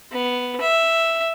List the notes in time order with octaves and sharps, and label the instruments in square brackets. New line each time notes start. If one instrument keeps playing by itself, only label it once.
[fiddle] B3
E5